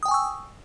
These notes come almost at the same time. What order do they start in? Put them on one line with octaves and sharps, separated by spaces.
D#6 G5 G#5 C#6 E6